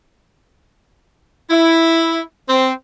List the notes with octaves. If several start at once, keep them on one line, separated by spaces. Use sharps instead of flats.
E4
C4